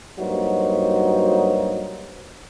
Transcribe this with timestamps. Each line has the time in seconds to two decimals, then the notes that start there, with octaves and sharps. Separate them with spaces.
0.19 G2 F#3 A#3 D#4 F#4 C5